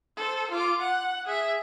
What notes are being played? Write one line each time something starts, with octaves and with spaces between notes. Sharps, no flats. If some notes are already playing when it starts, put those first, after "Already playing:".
A4 C5
F4 D6
F#5
G#4 E5